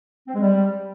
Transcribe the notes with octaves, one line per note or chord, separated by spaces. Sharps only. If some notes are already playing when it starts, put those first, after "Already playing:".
C4
G#3
G3